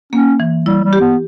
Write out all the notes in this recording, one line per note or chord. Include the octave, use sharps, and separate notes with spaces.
A#3 C#4
E3
G3 E4
G3
G4
B3